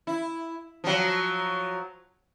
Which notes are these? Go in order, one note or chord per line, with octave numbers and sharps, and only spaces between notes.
E4
F3 F#3